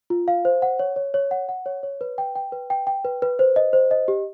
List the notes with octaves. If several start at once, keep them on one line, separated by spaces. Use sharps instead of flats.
F4
F5
C5
F#5
C#5
C#5
C#5
F#5
F#5
C#5
C#5
B4
G5
G5
B4
G5
G5
B4
B4
C5
D#5
C5
D#5
G4